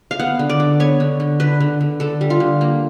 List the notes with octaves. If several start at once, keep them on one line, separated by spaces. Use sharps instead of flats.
F5
B3 F#5
D3
D5
D3
B3 C#5
D3
D3
D3 B4
D3
D3
D3 A4
G3
F4
D3
A#3